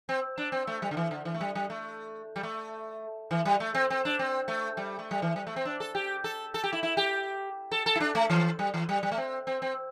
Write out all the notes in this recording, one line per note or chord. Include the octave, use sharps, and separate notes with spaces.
C4
D4
C4
A3
G3
D3
E3
D3
E3
A3
G3
G3
A3
G3
A3
E3
G3
A3
C4
C4
D4
C4
A3
G3
A3
G3
E3
G3
A3
C4
D4
A4
G4
A4
A4
G4
E4
E4
G4
A4
A4
E4
D4
A3
E3
G3
E3
G3
G3
A3
C4
C4
C4